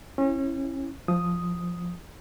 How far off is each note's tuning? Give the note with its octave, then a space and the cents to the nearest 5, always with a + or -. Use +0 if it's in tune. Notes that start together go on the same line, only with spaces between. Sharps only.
C#4 -30 E4 +0
F3 +0 D#6 +0